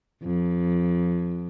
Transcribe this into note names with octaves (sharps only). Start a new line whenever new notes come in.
F2